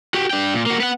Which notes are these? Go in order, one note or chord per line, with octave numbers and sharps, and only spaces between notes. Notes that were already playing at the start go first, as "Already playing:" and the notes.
F#4 G4
D4 G5
A#2
A#3 F#4
B3 F#5